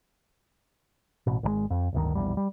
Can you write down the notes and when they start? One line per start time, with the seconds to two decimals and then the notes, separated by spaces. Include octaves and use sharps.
1.27 A1 B2
1.43 G#1 C#3 G#3
1.70 F2
1.93 D1 G1 D2 D#3
2.15 E1 A#1 E2 G3
2.37 G3